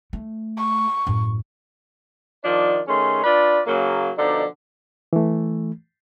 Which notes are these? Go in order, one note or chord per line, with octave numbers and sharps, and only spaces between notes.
A3
C#6
F#2 A2
D#3 F3 D4 D5
D#3 A3 C#4 G#4 C6
D4 F4 B4 D5
C#3 F#3 A#3
B2 D3 F3 D#4 D5
E3 A3